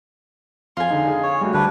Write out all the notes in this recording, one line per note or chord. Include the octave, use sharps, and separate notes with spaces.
F2 F4 G#5
D3 G#3 D#4
G#4 F5
C#5
G3 A3 F#4
D2 G3 D4 B4